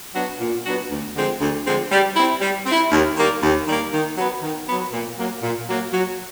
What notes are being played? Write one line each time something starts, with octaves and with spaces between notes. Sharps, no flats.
F#3 B3 D4 F#4
A#2
F#3 B3 D4 F#4
D2
D3 F3 G#3 C4
D2
D3 F3 G#3 C4
G3
C4 E4
G3
C4
E4
D#2
D#3 G3 A#3
D#2
D#3 G3 A#3
D#3
F#3 B3
D#3
F#3 B3
A#2
F#3 A#3
A#2
F#3 A#3
F#3